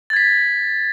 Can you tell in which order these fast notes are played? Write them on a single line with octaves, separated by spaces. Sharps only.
A6 G#6 B6